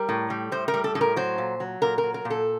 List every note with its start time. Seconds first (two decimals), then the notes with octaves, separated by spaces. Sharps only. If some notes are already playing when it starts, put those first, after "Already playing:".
Already playing: G3 A#4
0.09 A2
0.30 G3
0.52 A2 C5
0.68 A#4
0.74 G3
0.84 A4
0.95 A2 A4
1.01 A#4
1.16 F#3 C5
1.38 A#2
1.60 F#3
1.82 A#2 A#4
1.98 A#4
2.03 F#3
2.14 A#4
2.25 A#2
2.30 A4